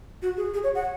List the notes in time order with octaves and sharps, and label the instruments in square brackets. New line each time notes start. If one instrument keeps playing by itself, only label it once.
[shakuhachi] F#4
G#4
G#4
C#5
F#5